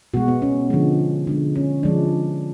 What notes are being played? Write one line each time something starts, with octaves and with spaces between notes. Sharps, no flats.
B2 G#3 F#4
B3
C#4
D3 F3 G#3
D3 G#3
C#4
D3 F3 G#3 D4